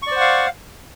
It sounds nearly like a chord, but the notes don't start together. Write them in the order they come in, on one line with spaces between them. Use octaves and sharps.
C#6 D5 C5 F#5 F5